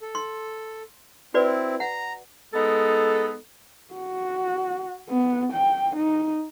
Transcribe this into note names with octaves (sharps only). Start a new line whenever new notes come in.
A4
C6
C4 E4 F#4 B4 D5
F#5 A#5
G#3 B3 D#4 A4
F#4
B3
G5
D#4